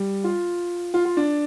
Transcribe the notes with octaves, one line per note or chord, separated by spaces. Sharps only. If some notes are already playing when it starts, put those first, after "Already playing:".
Already playing: G3
F4
F4
F4
D4